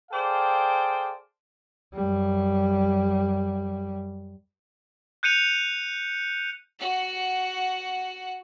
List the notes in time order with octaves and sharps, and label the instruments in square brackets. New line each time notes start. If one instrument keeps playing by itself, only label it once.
[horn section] G#4 A4 C5 D5 F5 G5
[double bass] F#2 G3
[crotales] F#6 G6 C#7 D#7 F7
[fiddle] F#4 F#5